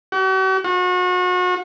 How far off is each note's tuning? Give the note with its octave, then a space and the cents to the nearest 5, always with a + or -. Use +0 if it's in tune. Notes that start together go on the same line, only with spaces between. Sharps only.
F#4 +45
F#4 -35